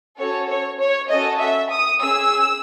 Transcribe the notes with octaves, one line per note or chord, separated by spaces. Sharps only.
C#4 F#4 A4 C#5
C#5
C#5
C#4 F#4 A4 D#5
E5
D#6
C#4 G#4 E6